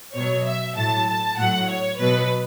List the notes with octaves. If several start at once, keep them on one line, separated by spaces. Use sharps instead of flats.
B2 F#3 C#5
E5
A2 F#3 A5
A5
A2 F#3 F#5
C#5
B2 F#3 B4